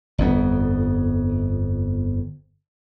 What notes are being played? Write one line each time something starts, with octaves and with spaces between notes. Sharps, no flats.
G1 F2 B3